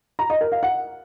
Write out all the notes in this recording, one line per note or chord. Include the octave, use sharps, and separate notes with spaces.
A#5
D#5
A#4
F5
F#5